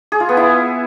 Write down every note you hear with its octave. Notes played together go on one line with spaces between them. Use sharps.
G#4
F4
B3
E4